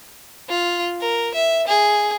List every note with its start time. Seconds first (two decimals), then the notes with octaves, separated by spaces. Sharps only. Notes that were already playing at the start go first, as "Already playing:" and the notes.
0.49 F4
1.00 A#4
1.34 E5
1.67 G#4